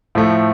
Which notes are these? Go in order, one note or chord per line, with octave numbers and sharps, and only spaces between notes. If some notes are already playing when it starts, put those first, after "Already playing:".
A2 F3 A3